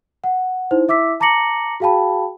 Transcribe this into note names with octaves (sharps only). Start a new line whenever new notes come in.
F#5
D#4 E4 C5
E4 E5 D6 E6 B6
A5 A#5 D6 A#6 C#7 F#7
F#4 G#4 F5 G5 A5 B5